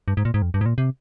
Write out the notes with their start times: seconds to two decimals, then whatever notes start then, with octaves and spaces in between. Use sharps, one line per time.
0.08 G2
0.17 G#2
0.25 A#2
0.34 G#2
0.42 F2
0.54 G2
0.61 G#2
0.66 A#2
0.78 C3